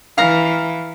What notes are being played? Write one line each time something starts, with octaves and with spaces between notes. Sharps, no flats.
E3 F5 A#5